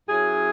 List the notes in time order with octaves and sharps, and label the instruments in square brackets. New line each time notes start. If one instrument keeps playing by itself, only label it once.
[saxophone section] F#2 F#3 C#4 E4 G#4